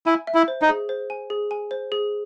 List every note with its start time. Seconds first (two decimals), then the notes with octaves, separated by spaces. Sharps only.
0.06 E4 G#5
0.27 E5
0.34 E4
0.48 C5
0.62 D#4
0.69 G#4
0.89 C5
1.10 G#5
1.30 G#4
1.51 G#5
1.71 C5
1.92 G#4